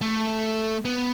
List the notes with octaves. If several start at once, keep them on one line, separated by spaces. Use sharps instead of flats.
A3
B3